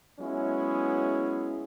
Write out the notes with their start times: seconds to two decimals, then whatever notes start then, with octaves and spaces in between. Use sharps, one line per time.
0.20 F#3 G#3 B3 C#4 E4